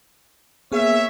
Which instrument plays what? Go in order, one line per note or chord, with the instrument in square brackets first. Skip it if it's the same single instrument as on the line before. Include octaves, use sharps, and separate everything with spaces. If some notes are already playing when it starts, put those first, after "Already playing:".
[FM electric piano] A#3 B3 G#4 [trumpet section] C#5 E5